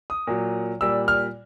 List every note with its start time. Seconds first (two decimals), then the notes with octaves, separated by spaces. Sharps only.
0.10 D#6
0.27 A#2 F#3
0.81 A#2 G3 E6
1.08 F6